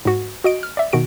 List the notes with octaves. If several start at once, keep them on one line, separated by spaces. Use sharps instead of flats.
G#2 F#4
F#4 D#5 D7
F6
D5 E5
B2 D#3 F#4 D7